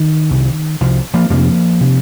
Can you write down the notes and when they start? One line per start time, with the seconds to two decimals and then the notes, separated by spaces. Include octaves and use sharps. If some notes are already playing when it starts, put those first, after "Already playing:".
Already playing: D#3
0.31 C2 C3
0.81 C2 C3 F3
1.14 F3 A#3
1.30 F2 C3 F3 A#3
1.81 C3